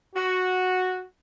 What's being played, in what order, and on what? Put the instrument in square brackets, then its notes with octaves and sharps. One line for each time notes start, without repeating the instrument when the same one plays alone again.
[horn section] F#4